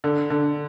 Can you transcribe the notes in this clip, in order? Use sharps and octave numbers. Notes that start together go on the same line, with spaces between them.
D3
D3